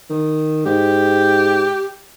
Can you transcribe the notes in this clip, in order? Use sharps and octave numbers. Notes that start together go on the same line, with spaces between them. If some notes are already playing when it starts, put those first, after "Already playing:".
D#3
G#2 G4